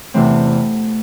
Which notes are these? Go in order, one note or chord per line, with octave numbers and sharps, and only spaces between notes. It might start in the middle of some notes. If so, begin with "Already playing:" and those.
E2 C3 E3 A3 C4